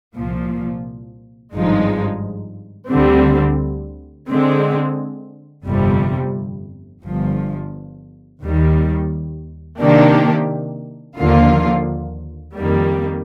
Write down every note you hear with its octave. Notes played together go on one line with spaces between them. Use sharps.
C2 A#2 F3
G#1 G2 F3 G#3 D#4
D2 D3 G3 C4
D3 G#3 C4
G1 F2 C3 G3
G1 G2 F3
D#2 D#3 G3
C3 D#3 A#3 D4 G4
D#2 D3 F3 A#3 F4
F2 D#3 G3 A#3